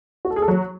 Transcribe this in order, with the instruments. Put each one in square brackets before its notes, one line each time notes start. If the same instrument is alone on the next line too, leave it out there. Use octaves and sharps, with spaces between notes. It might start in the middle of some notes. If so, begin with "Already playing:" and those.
[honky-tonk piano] F#4
A4
G#4
A4
F#3